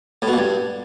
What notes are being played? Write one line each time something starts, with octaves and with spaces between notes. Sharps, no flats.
A2
B2
A#2
G2